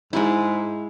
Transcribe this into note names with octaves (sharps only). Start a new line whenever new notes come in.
G#2 G#3 E4